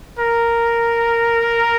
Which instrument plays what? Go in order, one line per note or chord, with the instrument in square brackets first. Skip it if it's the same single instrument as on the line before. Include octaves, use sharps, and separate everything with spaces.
[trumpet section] A#4